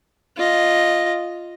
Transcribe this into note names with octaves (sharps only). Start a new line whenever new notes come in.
F4 D#5